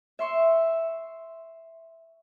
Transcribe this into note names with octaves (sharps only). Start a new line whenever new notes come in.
E5 C6 C#6